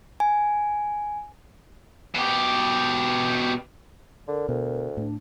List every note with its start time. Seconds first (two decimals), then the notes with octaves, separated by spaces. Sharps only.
0.20 G#5
2.15 B2 G4
4.28 D3 A#4
4.49 D2 B2
4.97 A2 D4